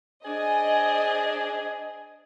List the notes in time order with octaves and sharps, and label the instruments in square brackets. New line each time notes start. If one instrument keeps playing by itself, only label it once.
[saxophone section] D4 G#4 C5 [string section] D#5 G#5